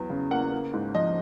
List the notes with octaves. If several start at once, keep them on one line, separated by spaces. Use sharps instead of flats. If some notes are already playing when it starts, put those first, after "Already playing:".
Already playing: E2 F#3
C#3
A#3 F#5
A#3
G#2
F3 D#5